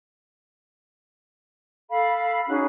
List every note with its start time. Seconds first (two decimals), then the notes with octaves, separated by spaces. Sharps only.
1.90 A4 F5 B5
2.49 C#4 D#4 F#4 G#4